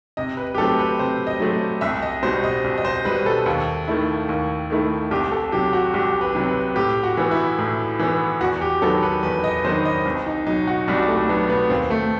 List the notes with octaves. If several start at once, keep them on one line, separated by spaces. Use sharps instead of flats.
C3 D#5
B4
G4
F#3 A3 C4 A4
B4
C3 C5
D#5
F#3 A3 C4
C2 E5
D#5
B2 G3 C5
D#5
C2
D#5
C5
B2 G3 B4
A4
D#2
D#3 A3 E4
D#2
D#3 A3 E4
C2 G4
A4
C3 F#3 G4
F#4
C2 G4
B4
C3 F#3
B4
A2 G4
F#4
E3 B3
E4
A2
E3 B3
E2 F#4
G4
D#3 F#3 B3 F#4 A4
B4
E2 B4
D#5
D#3 F#3 B3 F#4 C5
D#5
C2
D#4
B2 F#3 D#4
F#4
C2 G3
G3
A3
B2 F#3 B3
B3
D#2 C4
A3